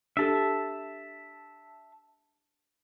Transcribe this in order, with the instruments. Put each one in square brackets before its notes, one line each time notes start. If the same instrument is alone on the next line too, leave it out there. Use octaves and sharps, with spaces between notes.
[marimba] D4 G4 A4 [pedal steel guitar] E5 A5